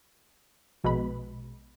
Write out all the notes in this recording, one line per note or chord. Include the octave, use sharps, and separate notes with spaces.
A#1 B2 G#3 B4 B5